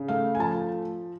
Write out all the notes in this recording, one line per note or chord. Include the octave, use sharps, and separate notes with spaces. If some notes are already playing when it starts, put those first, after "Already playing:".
Already playing: C#3
A3 F5
G#5
F3 A5